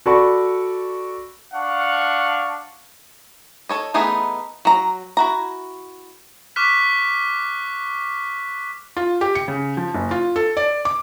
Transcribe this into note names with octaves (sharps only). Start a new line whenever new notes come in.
F#4 A4 D5 B5 C#6
D4 F5 F#5 C#6
A4 C#5 D#5
E3 A3 B3 D#4 G#4
F#3 A#5
E4 F#4 A#5
C#6 D6 F6 F#6 B6
F4
G4
C#7
C#3
F3
F#1
F4
A4
D5
D6